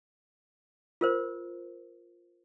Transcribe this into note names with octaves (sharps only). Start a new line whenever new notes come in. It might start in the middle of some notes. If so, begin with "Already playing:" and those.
F4 A#4 C5